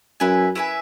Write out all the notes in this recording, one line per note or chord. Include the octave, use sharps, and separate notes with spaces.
F#2 E4 B4 E5 G#5
E4 B4 E5 G#5